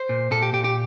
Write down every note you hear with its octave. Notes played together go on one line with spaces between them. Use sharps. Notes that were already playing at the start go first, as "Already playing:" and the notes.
Already playing: C5
A#2
A#2 A4
G4
A#2 G4
G4